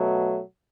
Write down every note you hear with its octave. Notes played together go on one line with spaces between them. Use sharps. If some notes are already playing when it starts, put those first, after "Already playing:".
Already playing: B2 F#3 A3